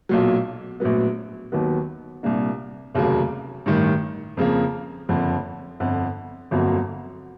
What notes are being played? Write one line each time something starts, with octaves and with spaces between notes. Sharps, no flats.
B1 A#2 F#3
A#1 A2 F#3 B3
D#2 D#3 F#3 B3
C2 A#2 G3 A#3 D4
F1 D#2 C#3 F#3 A#3
A1 G2 D#3
F2 C#3 F3 A#3
F#1 F2 D3 F3
G1 F2 D3
G1 F2 D3 F#3 A#3